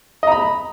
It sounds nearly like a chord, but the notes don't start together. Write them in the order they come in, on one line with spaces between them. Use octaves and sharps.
D#5 A#5 B5